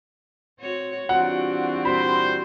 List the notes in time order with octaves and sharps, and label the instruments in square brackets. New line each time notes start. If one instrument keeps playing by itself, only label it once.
[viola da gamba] C4 F#4 C#5
[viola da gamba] E3 C4 D4 [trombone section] G3 F4 F#4 [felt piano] F#5
[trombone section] A#2 G3 F#4 [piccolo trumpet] C5 [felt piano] B5